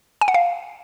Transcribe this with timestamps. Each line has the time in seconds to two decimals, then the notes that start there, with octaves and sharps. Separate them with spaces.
0.21 G#5
0.28 F#5
0.34 F5